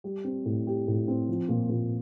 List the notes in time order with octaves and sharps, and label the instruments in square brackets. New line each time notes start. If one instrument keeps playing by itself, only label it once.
[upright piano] G3
C4
A2
G4
A2
C4
F3
A#2
A#2